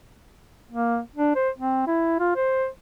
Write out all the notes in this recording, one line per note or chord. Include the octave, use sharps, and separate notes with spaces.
A#3
D4
C5
C4
E4
F4
C5